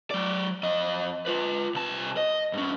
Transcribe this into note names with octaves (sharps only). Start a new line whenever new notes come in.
F#3 D5
F2 D#5
F4 B4
C2 A5
D#5
G2 C#4